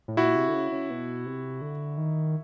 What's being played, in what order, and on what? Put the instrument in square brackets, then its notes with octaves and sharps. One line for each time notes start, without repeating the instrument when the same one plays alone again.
[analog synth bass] A2
[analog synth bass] A#2 [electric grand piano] E4 F#4
[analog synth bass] C3
D3
C#3
C#3
B2
C3
D3
D#3